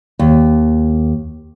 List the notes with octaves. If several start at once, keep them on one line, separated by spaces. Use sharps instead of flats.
D#2